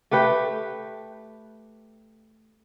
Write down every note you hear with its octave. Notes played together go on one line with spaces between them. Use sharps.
A3 G4 B4 G5